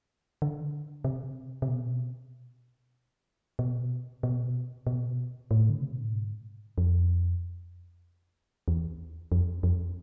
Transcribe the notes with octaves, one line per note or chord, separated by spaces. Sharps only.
D3
C3
C3
B2
B2
B2
B2
A2
D3
C3
B2
A2
G#2
F2
E2
F2
F2